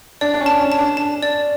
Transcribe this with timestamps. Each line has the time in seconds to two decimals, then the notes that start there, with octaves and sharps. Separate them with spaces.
0.21 D4 D5
0.34 D4
0.41 C#4
0.46 A5
0.59 C#4
0.72 A5
0.79 D4
0.97 A5
1.23 D5